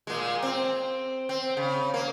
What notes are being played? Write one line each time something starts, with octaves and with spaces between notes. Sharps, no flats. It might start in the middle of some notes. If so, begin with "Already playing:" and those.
A#2 G#3
C4
C4
C#3
A#3